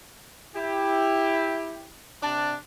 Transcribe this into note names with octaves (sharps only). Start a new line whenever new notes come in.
E4 G4
C3 D4 A5